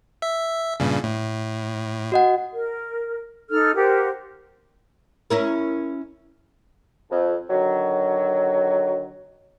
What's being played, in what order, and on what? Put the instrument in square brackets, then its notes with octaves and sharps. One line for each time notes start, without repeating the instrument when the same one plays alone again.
[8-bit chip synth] E5
G2 A#2 C#3
A2
[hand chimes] F#4 D#5 F#5
[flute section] A#4
D#4 A4 F6
G4 A#4 C5 F#5
[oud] C#4 E4 A#4
[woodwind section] F2
D3 D#3 F#3